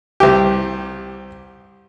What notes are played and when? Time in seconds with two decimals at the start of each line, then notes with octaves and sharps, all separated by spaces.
0.20 C2 G4